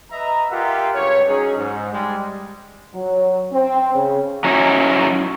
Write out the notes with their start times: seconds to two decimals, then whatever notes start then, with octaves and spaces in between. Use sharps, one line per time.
0.11 B4 D#5 E5 A#5
0.50 F4 G4 A#4 E5 F#5
0.95 C#2 G2 C#5
1.28 F#3 C#4 D#4 G#4
1.57 G#2
1.92 G3 G#3
2.94 F#3
3.52 C4
3.94 C#3
4.44 F#3 C#4 D#4 E4